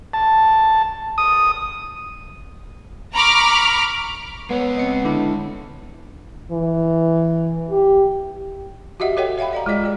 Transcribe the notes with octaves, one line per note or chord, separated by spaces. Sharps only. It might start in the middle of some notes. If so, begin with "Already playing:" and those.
A5
D#6
A#5 B5 C#6 D6 F6
G#3 B3 C#5
C4 D#5 C#7
D3 D4 E4
E3
G4
F#4 G4 D#5 E5 F#5
F#4 A4 C#5 D#5 F#5 G5
C#5 E5 F5 G5 B5
D5 F5 A#5
G#3 F4 G#4 D5 D#5 G5
F4 G#4 D5